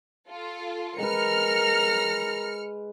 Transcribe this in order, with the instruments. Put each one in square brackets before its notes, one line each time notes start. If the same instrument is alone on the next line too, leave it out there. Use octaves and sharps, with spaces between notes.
[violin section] F4 A4
[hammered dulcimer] G#3 B4 [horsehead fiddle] A#4 A#5 [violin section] F6 C#7